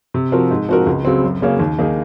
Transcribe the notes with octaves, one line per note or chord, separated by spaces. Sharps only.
C3
F3 C4 F#4 A#4
G#2
F3 C4 F#4 A#4
C#2
C#3 F#3 C4
F#2
C#3 F#3 A#3 C#4
D#2
D#3 A#3 D#4 G#4